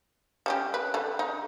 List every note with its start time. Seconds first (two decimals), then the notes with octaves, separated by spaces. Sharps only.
0.46 G3 C#4 G4
0.74 B4
0.94 D3 G3
1.19 D#4